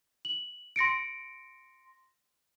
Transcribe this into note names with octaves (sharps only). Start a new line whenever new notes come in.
F#7
C6 A#6 C#7 D7